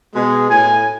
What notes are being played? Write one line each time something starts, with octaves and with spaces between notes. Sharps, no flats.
B2 G#3
A2 G#5